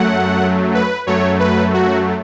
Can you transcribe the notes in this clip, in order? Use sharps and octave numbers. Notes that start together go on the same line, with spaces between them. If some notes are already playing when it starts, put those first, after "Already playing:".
Already playing: F#2 F#3 A3 F#5
B4
F#2 F#3 A3 C#5
B4
F#4